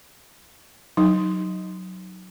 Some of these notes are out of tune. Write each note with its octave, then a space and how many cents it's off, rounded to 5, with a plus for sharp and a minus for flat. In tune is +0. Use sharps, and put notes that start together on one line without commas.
F#3 +0 D#4 +0